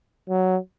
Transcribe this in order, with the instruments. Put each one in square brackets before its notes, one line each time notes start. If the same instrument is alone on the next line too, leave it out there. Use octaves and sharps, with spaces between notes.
[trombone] F#3